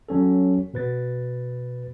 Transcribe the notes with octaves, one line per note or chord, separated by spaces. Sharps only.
F#3 C#4 A4
B2 B4 A6